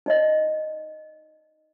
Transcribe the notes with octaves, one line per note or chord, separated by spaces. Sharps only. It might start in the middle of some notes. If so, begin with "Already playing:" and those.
D#4 D5 D#5